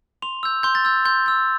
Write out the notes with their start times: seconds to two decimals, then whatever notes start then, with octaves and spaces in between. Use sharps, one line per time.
0.22 C6 F7
0.43 E6 G6
0.63 C6 G6
0.75 A6
0.85 E6 G6
1.05 C6 G6
1.26 E6 G6